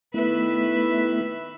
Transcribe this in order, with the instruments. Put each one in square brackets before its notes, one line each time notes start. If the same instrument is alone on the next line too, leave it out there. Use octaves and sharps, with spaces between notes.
[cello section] D#3 B4 E5 [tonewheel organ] A3 B3 E4